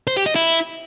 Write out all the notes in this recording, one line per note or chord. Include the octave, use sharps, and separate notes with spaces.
C5
G4
D#5
E4